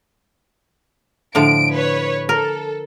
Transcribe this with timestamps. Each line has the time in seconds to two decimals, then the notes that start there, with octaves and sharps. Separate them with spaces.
1.35 A2 D3 F3 D7
1.72 B4 C#5
2.29 A4 A#4